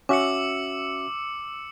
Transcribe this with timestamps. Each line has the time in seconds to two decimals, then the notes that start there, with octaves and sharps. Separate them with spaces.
0.09 C#4 F#4 E5 D6 E6 C#7